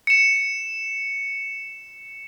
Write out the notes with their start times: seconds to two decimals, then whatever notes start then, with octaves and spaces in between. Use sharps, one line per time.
0.07 C#7 E7